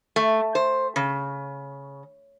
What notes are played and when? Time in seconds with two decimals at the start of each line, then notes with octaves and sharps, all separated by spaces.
0.16 A3
0.55 C5
0.96 C#3